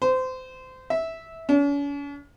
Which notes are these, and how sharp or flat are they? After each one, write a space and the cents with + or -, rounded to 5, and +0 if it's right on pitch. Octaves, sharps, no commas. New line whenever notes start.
C5 -25
E5 -15
C#4 +45